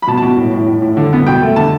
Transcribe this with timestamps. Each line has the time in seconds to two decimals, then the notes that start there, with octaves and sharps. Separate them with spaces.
0.02 B5
0.07 B2 A5
0.17 A5
0.22 B2
0.38 A2
0.53 A2
0.68 A2
0.82 A2
0.97 D3
1.13 B3
1.27 B2 G5
1.42 A3
1.56 D3 A5